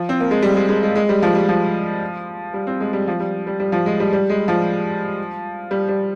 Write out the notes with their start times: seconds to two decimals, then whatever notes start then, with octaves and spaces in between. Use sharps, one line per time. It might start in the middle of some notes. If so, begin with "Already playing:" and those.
Already playing: F3
0.09 C4
0.20 A#3
0.31 G#3
0.42 G3
0.56 G#3
0.69 G#3
0.83 G#3
0.95 G#3
1.09 G3
1.22 F3
1.35 G3
1.48 F3
2.54 G3
2.67 C4
2.80 G#3
2.93 G3
3.07 F3
3.20 G3
3.47 G3
3.60 G3
3.72 F3
3.86 G#3
4.00 G3
4.13 G3
4.29 G#3
4.48 F3
5.71 G3
5.89 G3